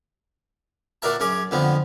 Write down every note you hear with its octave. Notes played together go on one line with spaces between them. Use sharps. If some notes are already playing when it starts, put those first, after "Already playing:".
A#2 D4 F#4 A#4 E5 A5
F#2 C#4 G#4 D6
F2 D3 F3 B3